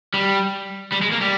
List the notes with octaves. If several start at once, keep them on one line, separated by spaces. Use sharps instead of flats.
G3
G3
G#3
A#3
G3